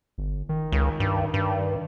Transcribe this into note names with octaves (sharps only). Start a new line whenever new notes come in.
G1
D#3
C#2
G2
G2